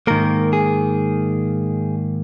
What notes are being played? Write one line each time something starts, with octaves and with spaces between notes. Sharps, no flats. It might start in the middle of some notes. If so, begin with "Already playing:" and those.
G#2 D#3 A#3 A#4
G#4